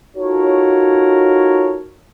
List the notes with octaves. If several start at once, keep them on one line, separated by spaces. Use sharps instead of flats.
D#4 F4 F#4 A4 A#4 C#5